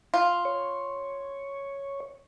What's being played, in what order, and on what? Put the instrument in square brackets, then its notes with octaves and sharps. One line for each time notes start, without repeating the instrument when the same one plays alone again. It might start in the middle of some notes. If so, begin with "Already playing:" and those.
[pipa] F4
[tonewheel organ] C#5